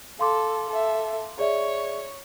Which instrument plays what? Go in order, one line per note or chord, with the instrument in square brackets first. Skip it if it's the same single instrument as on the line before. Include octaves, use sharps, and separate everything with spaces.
[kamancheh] A4 [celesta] F5 C6 D6
[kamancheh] A4 E5
[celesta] G#4 D5 E5 [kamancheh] C#5